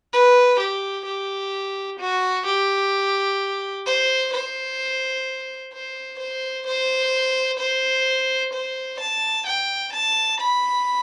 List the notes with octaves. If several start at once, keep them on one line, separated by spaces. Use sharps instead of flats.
B4
G4
G4
F#4
G4
C5
C5
C5
C5
C5
C5
C5
A5
G5
A5
B5